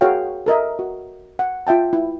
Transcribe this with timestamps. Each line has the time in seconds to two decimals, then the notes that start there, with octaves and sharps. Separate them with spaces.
0.01 F#4 G#4 A#4 C#5 F5 G5
0.46 A4 A#4 D#5 E5
0.79 F#4
1.39 F#5
1.67 F4 E5 G5 A5
1.93 E4